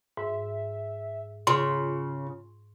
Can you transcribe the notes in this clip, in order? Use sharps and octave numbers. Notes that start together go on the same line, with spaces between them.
G#2 E5
C#3 F4 C6